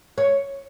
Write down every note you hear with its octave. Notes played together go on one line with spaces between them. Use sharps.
C#5